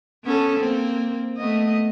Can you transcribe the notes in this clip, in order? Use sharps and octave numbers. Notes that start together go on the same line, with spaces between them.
B3 C#4 A4
A#3 C4
A3 B3 D#5